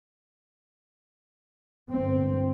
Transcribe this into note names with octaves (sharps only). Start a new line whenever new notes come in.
G1 C4